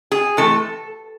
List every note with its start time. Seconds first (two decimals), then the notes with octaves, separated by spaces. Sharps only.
0.12 G#4
0.37 C3 E3 A3 A4